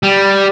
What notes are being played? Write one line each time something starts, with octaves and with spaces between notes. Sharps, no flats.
G3